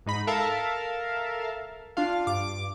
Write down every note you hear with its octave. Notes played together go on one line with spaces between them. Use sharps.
G#2 D#4 B5
A4 A#4 E5 F5 A5
D4 F4 F5
G2 D6